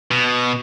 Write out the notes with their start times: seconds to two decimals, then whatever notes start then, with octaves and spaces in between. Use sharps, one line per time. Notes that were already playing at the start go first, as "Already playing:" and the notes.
0.11 B2